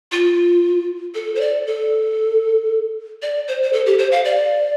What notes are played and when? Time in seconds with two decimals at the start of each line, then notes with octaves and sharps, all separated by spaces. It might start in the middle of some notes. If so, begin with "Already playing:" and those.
0.12 F4
1.14 A4
1.35 C5
1.41 D5
1.67 A4
3.22 D5
3.48 C5
3.63 C5
3.73 A4
3.86 G4
3.98 C5
4.12 F5
4.25 D5